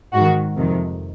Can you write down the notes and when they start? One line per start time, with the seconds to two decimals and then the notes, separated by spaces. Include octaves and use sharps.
0.13 G#2 D#3 F#4
0.56 F2 C3 D#3